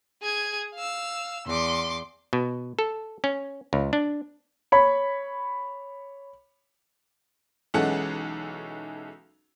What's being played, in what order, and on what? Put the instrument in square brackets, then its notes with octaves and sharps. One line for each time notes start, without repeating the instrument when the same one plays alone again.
[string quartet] G#4 G#6
F5 E6
E2 C6 D6
[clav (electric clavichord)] B2
A4
C#4
C#2
D4
[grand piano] C#5 B5
[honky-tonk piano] B1 E3 G#3 C#4 A4 F#5